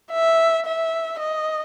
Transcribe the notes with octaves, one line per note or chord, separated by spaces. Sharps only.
E5
E5
D#5